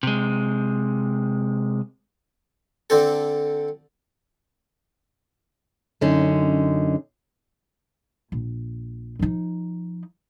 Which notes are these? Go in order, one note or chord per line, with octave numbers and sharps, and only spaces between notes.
C3 G#3
D3 C4 A4
F#2 D3 C#4 D#4
A#1
F3 D#4